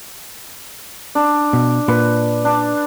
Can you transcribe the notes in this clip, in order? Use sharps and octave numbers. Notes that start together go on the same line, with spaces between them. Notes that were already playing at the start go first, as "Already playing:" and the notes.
D4
B2
A#2 B4
D4